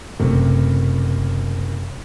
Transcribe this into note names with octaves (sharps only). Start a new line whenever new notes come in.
F#1 C3 A3